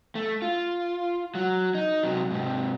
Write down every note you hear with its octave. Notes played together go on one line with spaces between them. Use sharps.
A3
F4
F#3
D#4
C3 F#3
G#2 C3